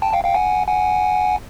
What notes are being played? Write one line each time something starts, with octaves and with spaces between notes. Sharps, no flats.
G5 A5
F5 G5
F5 G5
F#5 G#5
F#5 G#5